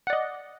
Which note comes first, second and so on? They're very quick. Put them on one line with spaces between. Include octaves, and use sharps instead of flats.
F#5 D5 D#5